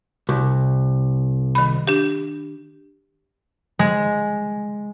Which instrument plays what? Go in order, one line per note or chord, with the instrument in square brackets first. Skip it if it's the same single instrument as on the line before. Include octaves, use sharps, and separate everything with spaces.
[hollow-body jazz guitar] C2
[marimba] D#3 B5
D4 G4
[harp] G#3